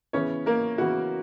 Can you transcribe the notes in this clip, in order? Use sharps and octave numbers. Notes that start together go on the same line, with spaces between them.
C#3 E3 B3 C#4 C#5
A#3 A#4
C#3 E3 B3 F#4